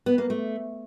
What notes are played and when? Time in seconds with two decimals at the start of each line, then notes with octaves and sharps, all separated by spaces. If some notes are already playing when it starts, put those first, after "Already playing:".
0.06 B3
0.18 A#3
0.30 A3